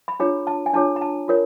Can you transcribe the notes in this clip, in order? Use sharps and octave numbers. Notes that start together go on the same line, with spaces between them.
B5
D4 F4 G#4 C#5 A#5
A5
G#5
D4 F4 G#4 C#5 A5
A#5
A5
F4 A#4 C#5